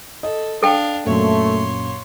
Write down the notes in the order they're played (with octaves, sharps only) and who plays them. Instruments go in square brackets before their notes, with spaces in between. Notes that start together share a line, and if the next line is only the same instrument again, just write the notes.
[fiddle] A4 [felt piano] D#5
[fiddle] D4 F5 [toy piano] A4 G5
[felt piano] F#2 A#2 [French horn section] A3 [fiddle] C#5 C6